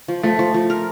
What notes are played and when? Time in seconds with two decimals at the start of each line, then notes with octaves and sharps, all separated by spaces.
0.08 F3
0.24 F3 A3
0.39 F3
0.54 F3
0.70 A#4